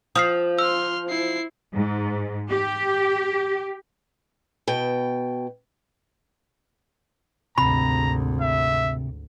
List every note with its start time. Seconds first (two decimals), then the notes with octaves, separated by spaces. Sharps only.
0.15 F3 D#6 F6 C7
0.59 C6 E6 F6
1.09 E4 C7
1.73 G#2
2.50 G4
4.68 B2 G5
7.58 G#1 D2 C3 A#5 B5
8.41 E5